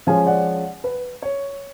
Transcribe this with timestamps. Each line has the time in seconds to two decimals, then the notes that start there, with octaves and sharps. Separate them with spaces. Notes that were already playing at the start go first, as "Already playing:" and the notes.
0.07 F3 G#3 C#4 F5 G#5
0.26 D5 F#5
0.84 B4
1.22 C#5